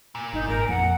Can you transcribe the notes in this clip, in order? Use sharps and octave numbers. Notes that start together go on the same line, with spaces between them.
A#2
G1 D#4
G#1 A#4
F2 F#5